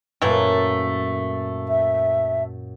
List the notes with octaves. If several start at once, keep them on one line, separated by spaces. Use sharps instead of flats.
F#2 A#2 E3 A3 A#3
E5